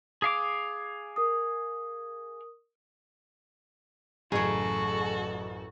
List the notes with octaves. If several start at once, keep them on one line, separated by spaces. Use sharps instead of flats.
G#4 F5 D6
A#4 D#6
A1 F#2 C#3 F#3 F#4 G#4 A4